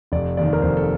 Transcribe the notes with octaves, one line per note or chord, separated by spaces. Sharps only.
F1 D5
D#2 D#3 D5
A#4
F1 C5
A4